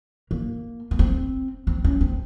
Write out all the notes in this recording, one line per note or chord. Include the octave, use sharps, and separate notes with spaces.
A#3
A#3
C4
C4
C#4
C4